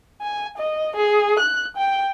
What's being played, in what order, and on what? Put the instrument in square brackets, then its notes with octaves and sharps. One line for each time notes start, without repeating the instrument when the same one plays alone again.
[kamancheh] G#5
D#5
G#4
F#6
G5